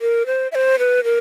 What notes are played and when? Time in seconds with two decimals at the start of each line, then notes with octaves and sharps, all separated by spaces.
0.01 A#4
0.26 C5
0.52 E5
0.55 C5
0.79 B4
1.04 A#4